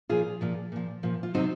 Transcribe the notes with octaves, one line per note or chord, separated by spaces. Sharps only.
A#2 F3 F4 G#4
A#2 F3
A#2 F3
A#2 F3
F4
C3 D#3 F#3 C4 D#4